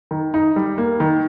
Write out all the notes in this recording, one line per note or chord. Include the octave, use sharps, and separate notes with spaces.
D#3
D#4
G3
A#3
D#3